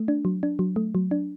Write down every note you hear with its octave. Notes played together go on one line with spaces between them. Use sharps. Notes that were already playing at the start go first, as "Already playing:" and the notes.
Already playing: A3
D4
F#3
D4
F#3
A3
F#3
D4